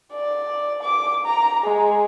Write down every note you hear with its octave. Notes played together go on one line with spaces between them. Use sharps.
D5
D6
A#5
G#3